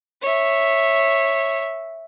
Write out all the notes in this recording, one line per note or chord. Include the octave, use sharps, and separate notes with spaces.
C#5 E5